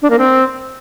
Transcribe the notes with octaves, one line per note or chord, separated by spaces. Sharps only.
D4
A#3
C4